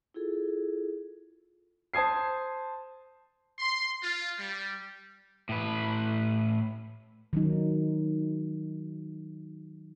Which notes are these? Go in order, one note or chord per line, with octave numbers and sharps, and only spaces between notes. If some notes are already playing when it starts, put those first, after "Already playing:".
E4 F4 G#4 A4
C5 A5 D#6 G#6 C7
C6
F4
G3
A2 B4
D#3 F#3 D#4